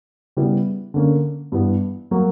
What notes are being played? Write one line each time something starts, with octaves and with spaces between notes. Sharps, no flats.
C#3 G3 B3 E4 B4
D3 A#3 C#4
G2 E3 B3
F#3 A#3